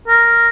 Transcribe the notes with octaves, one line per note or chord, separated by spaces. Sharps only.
A#4